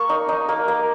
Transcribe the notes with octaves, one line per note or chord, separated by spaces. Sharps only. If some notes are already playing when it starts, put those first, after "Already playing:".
Already playing: A#3 C#6
D#4
D#4
A#3
A#3